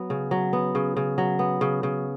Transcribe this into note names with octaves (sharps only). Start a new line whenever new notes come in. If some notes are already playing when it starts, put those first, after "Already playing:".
Already playing: F#3 B3
C#3
F#3
B3
C#3
C#3
F#3
B3
C#3
C#3